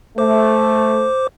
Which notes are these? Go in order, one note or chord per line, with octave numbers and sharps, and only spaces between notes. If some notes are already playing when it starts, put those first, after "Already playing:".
A3 C5 D6